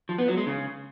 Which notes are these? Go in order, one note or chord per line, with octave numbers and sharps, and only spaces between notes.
F3
B3
F#3
G#3
C#3